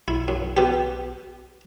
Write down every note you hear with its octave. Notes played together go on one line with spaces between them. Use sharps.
B1 E4
F#2
B2 G4